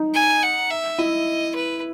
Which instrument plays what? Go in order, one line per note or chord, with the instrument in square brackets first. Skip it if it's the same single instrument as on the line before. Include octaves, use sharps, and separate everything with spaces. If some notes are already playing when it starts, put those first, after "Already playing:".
Already playing: [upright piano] D#4
[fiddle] G#5
F#5
E5
[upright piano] E4 [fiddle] D#5
[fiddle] B4